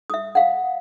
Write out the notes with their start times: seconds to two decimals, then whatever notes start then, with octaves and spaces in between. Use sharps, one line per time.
0.10 E5 D#6
0.35 F5 F#5